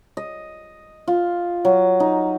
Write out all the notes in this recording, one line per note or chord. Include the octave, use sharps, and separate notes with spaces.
D#5
F4
F#3
D#4